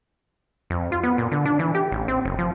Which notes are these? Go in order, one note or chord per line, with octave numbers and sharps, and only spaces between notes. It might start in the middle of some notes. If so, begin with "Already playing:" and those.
F2
F4
B3
A#2
D3
D4
E3
G4
A1
C4
F#1
F3